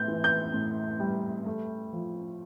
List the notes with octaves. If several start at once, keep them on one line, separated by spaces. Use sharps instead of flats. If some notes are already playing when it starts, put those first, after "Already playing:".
Already playing: A2 G6
E3
G6
A2
G3
A3
F3